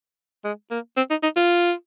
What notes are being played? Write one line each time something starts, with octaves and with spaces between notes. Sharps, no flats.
G#3
A#3
C4
D#4
D#4
F4